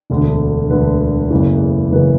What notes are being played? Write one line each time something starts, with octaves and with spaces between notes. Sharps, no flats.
E1 D2 D3
E1 D2 D3 B4
F#1 E2 C#3 E3
F#1 C#3 E3 B4